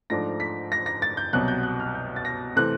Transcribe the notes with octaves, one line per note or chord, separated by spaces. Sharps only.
G#2 F3 A3 D4 A#6
B6
A#6
A#6
A6
G6
C2 B2 F#3 F#6
G6
F#6
F6
G6
A6
A#6
C3 E3 A3 C4 F#6